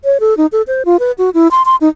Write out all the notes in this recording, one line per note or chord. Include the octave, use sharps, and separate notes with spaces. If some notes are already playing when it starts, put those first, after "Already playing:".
C#5
A4
D#4
A4
C5
F4
B4
F#4
E4
C6
C6
D#4